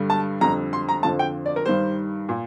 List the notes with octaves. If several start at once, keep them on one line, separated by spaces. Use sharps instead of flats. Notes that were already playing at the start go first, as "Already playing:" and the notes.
Already playing: G2 D3 G3
A5
F2 D3 G3 A#5
C6
A#5
F2 D3 F3 A5
G5
D5
A#4
G2 D#3 G3 C5
A#2